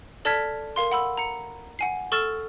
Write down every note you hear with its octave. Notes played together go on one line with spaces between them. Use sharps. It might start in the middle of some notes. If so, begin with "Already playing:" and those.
A4 D5 A5 F6 G#6 B6
A#4 F5 C6
F#5 B5 E6
A#5 C#7
F#5 G#5 C7
A4 C#6 E6 F6 A6 E7